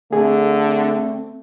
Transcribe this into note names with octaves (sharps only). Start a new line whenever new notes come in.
D3 A3 C4 G#4